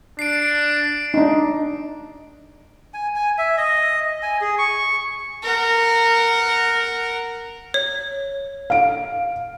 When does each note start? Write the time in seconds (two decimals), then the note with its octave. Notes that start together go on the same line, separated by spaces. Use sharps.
0.19 D4 C7 D7
1.14 D4 D#4
2.94 G#5
3.15 G#5
3.38 E5
3.58 D#5
4.23 G#5
4.41 G#4
4.58 C#6
5.43 A#4 F#5
7.74 C#5
8.70 F5 D7